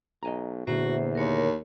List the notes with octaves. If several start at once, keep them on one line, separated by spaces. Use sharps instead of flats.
B1 D#5 G#5 A#5
E2 A#2 D3 A3 A#3 F#4 C5 E5
D#2 A#4 C#5